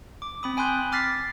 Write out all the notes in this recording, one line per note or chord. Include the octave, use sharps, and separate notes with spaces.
D6
C4 B5 D#6
G5 G#5 B5 C6 F#6 G6
D6 F6 A6 B6 C7